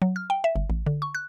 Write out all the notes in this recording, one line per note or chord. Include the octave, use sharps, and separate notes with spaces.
F#3
F6
G5
E5
G1
A1
D3
C#6
F#6